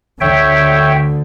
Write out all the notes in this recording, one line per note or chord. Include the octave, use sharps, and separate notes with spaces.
D2 D3 C#5 E5 G5